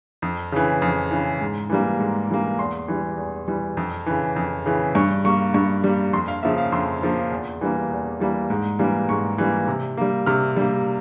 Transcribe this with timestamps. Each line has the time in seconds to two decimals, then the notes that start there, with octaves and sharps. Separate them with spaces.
0.22 F2
0.52 C#3 E3
0.82 F2
1.11 C#3 E3
1.41 G#2
1.70 E3 G3 A#3
1.99 G#2
2.29 E3 G3 A#3
2.59 E2 C6
2.88 E3 G3
3.17 E2
3.48 E3 G3
3.77 F2
4.06 C#3 E3
4.36 F2
4.66 C#3 E3
4.95 G2 C#6
5.24 G3 A#3 C#6
5.54 G2 C#6
5.84 G3 A#3
6.13 F2 C6
6.28 F5
6.43 C#3 F3 A#3 E5
6.58 F5
6.72 F2 C6
7.02 C#3 F3 A#3
7.32 E2
7.61 E3 G3 A#3
7.91 E2
8.20 E3 G3 A#3
8.50 G#2
8.79 E3 G3 A#3
9.09 G#2 C#6
9.38 E3 G3 A#3
9.68 C3
9.97 G3 A#3
10.26 C3 F6
10.56 G3 A#3